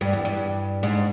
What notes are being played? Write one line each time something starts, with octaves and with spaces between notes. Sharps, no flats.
G2
E2
G2
G#2